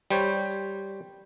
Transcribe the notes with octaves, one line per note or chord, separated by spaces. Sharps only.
G3 C5 C#5